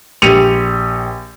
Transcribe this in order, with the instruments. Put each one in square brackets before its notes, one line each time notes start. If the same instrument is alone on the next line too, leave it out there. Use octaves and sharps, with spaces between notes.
[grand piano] A#1 G4 C#7 D#7 F7